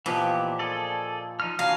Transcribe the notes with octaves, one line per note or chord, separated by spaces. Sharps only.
A#2 E3 F3 B3 G4 D#5
G#4 A4 D5
F3 D#4 F6
E3 D4 F#4 F5 G#5 A#5